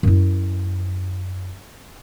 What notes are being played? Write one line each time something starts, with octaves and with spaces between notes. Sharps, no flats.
F#2 E4